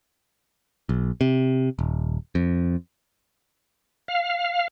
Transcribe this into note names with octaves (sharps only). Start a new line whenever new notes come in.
B1
C3
D#1
F2
F5